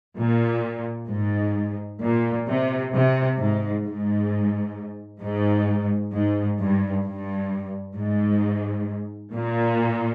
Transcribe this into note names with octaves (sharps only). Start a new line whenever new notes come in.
A#2
G#2
A#2
C3
C3
G#2
G#2
G#2
G#2
G2
G2
G#2
A#2